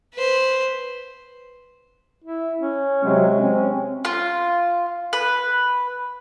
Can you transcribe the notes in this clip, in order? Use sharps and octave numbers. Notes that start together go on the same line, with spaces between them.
B4 C5
E4
C#4
C3 F#3 G#3
C4 C#4
F4
B4